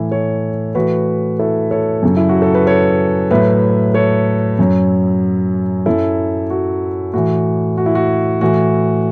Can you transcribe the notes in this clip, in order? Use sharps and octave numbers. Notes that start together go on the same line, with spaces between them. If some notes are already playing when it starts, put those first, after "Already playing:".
Already playing: A2 E3 E4
A4 C#5
A2 E3 F#4 B4
E4 A4
A4 C#5
F#2 C#3 F#3
E4
F#4
A4
B4
A4 C#5
A2 F#3 B4 E5
A4 C#5
F#2 F#3
F#2 F#3 E4 A4
F#4
A2 E3 F#4
F#4
E4
F#4
A2 E3 F#4